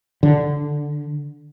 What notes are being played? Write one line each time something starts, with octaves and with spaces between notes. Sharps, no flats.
D3